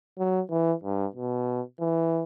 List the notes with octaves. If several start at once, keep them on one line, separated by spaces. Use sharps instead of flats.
F#3
E3
G2
B2
E3